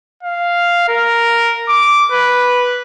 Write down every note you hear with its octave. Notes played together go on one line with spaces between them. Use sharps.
F5
A#4
D6
B4